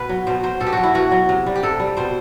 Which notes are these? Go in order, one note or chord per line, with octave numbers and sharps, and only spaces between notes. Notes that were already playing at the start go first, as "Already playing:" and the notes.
Already playing: B2 B4
F#3
B2 C5
F#3 C5
B2 A4
G4
F#3 F#4
E4
B2 F#4
F#3
C3
G3
G4
C3 A4
G3
B2 C5